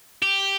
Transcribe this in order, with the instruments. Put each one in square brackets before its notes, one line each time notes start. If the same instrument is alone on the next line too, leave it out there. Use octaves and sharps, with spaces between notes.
[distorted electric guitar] G4